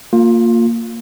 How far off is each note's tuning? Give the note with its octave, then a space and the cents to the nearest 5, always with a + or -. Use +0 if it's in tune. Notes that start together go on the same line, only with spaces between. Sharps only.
A#3 -15 F4 +20